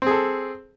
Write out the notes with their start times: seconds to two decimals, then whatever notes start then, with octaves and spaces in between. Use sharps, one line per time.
0.02 C4
0.06 G#4
0.11 A4